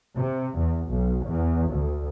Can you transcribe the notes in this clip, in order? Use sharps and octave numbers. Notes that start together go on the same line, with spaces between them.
C3
E2
B1
E2
D2